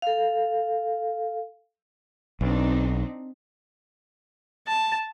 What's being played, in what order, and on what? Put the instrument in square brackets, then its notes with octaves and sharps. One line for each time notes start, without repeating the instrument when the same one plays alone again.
[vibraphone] A4 F5
[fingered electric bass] B1 [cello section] C4 D4 D#4
[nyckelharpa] A5